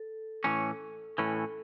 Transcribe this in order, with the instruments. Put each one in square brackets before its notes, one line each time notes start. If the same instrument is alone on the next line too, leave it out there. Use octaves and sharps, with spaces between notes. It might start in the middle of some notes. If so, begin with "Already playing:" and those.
Already playing: [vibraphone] A4
[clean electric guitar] A2 E3 C#4
[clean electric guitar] A2 E3 C#4 [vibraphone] A4